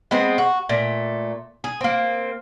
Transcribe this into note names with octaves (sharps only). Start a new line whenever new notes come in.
G#3 B3 C4
F#4
A#2 A3
G#4
A#3 C4